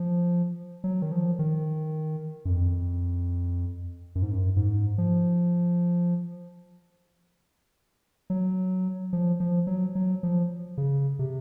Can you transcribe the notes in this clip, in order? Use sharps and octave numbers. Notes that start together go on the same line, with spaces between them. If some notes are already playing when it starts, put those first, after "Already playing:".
Already playing: F3
F#3
D#3
F3
D#3
F#2
F2
F#2
G#2
F#2
G#2
F3
F#3
F3
F3
F#3
F#3
F3
C#3
C3